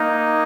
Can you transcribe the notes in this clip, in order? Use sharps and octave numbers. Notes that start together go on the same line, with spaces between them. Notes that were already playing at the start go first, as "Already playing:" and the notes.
Already playing: A#3 D#4